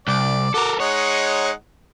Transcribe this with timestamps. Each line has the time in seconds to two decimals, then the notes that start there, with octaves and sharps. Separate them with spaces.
0.08 C2 D5
0.54 F#4 A4 A#4 D6
0.80 G#3 D#4 C#5 F#5